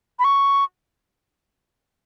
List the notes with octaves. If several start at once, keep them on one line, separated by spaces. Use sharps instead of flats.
B5
C#6